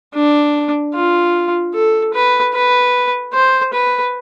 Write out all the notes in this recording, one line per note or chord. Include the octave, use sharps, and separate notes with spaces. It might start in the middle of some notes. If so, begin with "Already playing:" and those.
D4
F4
A4
B4
B4
C5
B4